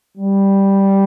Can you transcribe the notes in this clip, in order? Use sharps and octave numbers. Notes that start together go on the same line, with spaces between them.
G3